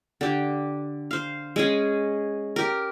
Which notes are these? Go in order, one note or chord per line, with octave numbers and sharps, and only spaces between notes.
D3 G4
C5 F5
G#3 C#4 G#4
G4 A#4